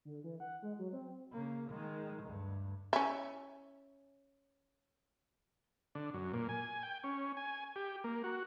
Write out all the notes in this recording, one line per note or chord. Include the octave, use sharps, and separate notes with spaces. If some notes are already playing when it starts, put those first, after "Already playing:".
D3
E3
F#5
G#3
F#3
C4
C#3 A#3
D#3 G#3
D2 G2
C#4 E4
D3
F#2
A#2
G#5
G5
C#4
G#5
G4
A#3
F#4